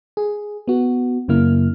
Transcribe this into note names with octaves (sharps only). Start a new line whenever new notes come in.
G#4
B3 F#4
F#2 C#3 A#3 E4 F6